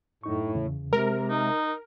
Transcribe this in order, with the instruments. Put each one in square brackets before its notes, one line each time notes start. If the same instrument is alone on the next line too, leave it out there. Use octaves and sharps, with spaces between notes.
[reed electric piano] F#2 D#4 C#6 [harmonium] A2
[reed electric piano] E2 C#3
[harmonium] C3 [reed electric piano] G#3 [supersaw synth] A#4
[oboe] D#4